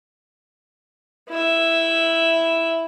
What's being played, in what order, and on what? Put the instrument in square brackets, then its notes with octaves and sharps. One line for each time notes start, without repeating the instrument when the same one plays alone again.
[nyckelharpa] E4 E5